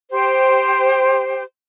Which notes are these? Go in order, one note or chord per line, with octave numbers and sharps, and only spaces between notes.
G4 C5